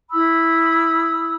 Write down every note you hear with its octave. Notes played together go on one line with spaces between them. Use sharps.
E4 B5 D#6 E6